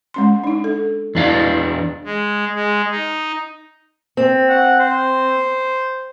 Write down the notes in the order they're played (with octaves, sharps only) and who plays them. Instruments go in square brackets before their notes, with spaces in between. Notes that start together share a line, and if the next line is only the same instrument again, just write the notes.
[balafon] G#3 C#4 C6
D4 D#4
A4
[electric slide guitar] E2 D4 F5 [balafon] E4
[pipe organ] G#3
G#3
D#4
[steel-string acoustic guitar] C4
[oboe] F#5
C5